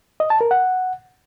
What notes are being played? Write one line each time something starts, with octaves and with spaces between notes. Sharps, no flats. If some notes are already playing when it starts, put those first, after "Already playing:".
D#5
A5
A#4
F#5